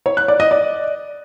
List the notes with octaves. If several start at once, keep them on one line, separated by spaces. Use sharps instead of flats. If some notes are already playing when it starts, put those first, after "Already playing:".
C#5
F#6
D5
D#5
D5